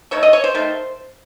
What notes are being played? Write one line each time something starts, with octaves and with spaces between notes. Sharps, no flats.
D#3 A3 C#5
D#5
C#5
C5
D#3 A3